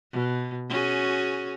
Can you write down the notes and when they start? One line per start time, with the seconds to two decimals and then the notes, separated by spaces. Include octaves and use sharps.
0.12 B2
0.69 C#4 F#4 G#4